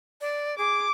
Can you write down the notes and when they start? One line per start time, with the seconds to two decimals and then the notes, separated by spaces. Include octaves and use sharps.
0.21 D5
0.58 G#4 D6